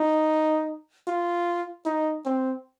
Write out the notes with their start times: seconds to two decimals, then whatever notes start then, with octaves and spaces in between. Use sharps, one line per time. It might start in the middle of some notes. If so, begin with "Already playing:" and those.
Already playing: D#4
1.08 F4
1.86 D#4
2.26 C4